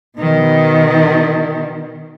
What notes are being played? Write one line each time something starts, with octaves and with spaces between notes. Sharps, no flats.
B2 D#3